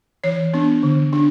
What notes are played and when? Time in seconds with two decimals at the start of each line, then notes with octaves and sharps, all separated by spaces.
0.24 E3 C#5
0.54 B3 D4
0.83 D3
1.13 D4